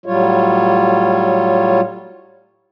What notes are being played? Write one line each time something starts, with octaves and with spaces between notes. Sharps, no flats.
A2 F#3 G3 F4 C#5